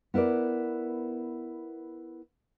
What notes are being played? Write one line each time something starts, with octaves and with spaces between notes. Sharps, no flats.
B3 E4 A#4 B4 D5